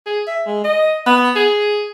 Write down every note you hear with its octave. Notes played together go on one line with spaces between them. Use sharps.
G#4
E5
G#3
D#5
B3
G#4